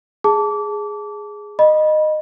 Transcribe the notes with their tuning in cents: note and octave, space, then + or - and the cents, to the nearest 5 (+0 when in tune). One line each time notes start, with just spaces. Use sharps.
G#4 +0 A5 +0 D6 -25
D#5 -15 B5 -20